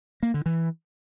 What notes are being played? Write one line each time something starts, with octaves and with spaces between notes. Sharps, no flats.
A#3
D3
E3